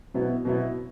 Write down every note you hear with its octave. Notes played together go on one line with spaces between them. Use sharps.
B2 F#3 B3 E4
B2 F#3 B3 E4